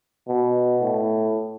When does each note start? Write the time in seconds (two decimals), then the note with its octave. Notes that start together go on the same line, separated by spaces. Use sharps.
0.28 B2
0.82 A2